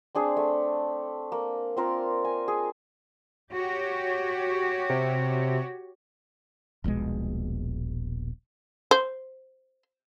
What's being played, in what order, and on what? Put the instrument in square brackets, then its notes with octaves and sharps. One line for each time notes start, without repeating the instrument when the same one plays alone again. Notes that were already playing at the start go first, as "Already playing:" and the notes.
[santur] C4 D4 G#4
A3
A#3
C4 F4 A#4
G#5
G#4
[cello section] F#4 G4 C#5
[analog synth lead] C3
[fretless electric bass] D#1 A#1 B2 G#3
[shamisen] C5